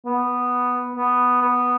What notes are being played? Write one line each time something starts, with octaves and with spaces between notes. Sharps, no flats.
B3
B3
B3